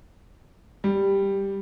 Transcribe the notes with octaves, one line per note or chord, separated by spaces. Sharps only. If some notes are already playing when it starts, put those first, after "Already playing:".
G3